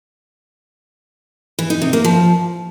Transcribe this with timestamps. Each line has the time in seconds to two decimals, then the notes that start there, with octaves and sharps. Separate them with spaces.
1.59 E3
1.70 D#4
1.82 C3
1.93 A#3
2.04 F3